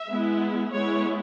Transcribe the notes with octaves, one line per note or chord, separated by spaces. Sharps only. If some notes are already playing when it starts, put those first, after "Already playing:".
Already playing: E5
G#3 B3 E4
G#3 B3 E4 C#5